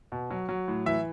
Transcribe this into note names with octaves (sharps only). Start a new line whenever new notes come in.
B2
F#3
F#3
A2
E3 E5